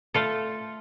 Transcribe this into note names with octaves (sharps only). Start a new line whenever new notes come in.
A3 F4 A4